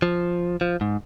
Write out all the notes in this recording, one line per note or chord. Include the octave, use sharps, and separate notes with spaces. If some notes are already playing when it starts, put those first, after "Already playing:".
F3
F3
G#2